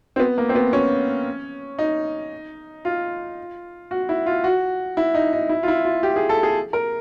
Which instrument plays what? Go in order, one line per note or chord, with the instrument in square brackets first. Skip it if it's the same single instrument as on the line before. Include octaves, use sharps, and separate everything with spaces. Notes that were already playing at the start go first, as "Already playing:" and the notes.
[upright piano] C4
B3
A#3
C4
B3
C#4
D#4
F4
F#4
E4
F4
F#4
E4
D#4
D#4
E4
F4
E4
F4
G4
G#4
A4
G#4
A#4